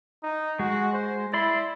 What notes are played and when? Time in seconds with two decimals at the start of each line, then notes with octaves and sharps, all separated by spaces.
0.23 D#4
0.59 G#3 F#4
0.93 C5
1.34 E4 D5 B5 C6